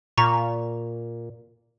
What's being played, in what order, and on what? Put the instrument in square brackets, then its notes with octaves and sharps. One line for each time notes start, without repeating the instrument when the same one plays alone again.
[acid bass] A#2 [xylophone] A#5 C#6